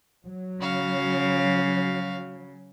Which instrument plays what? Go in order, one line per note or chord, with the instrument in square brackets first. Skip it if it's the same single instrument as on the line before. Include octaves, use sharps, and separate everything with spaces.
[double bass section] F#3
[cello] C#3 [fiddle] F#4 F5